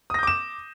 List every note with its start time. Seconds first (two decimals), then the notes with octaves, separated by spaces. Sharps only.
0.10 D#6
0.14 A#6
0.19 G6
0.23 D6
0.27 E7